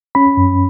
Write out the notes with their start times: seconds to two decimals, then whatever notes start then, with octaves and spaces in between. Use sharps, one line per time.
0.15 C#4 B5
0.37 F#2